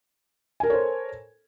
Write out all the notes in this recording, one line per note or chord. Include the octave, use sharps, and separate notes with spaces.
A4 A#4 C5 C#5 G#5